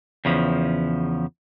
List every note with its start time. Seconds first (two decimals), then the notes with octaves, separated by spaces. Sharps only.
0.25 E2 C#3 F3